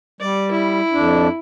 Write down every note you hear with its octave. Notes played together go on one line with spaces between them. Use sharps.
G3 D5
E4
F2 D4